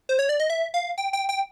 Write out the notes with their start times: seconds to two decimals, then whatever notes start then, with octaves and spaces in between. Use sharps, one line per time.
0.09 C5
0.19 C#5
0.29 D5
0.40 D#5
0.50 E5
0.74 F5
0.98 G5
1.13 G5
1.29 G5